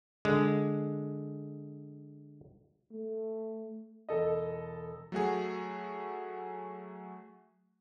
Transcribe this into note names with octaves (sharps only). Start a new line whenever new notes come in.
D3 G#3
A3
E1 A4 D#5
F#3 A3 F#4 G#4